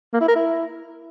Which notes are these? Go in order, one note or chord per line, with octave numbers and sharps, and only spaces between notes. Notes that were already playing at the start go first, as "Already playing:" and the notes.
A#3
E4
A#4
E4